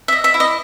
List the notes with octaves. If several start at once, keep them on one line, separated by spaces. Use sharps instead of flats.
E5
D#5
E5
E4
D#5